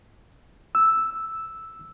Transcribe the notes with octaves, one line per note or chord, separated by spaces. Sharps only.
E6